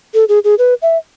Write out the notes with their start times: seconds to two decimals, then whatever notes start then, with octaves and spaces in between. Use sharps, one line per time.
0.14 A4
0.29 G#4
0.44 G#4
0.59 B4
0.82 E5